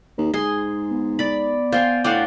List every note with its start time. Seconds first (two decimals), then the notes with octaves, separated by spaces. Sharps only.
0.18 D#2
0.34 G#2 G#4 C6
0.91 B3
1.19 D5 B5
1.72 F4 C5 G5 G#5
2.04 A2 D4 F4 F#4 G5